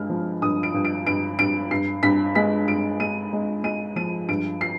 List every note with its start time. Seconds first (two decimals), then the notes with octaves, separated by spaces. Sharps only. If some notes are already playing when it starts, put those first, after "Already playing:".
Already playing: G2 G#3 F6
0.10 F3
0.42 G2 D#6
0.63 D7
0.74 G2
0.85 D7
1.07 G2 D7
1.39 G2 D7
1.71 G2 C7
2.03 G2 B6
2.35 G#3 B6
2.67 G2 D7
3.00 G#3 D#7
3.33 G#3
3.64 G#3 D#7
3.96 F3 D#7
4.28 G2 D7
4.61 C7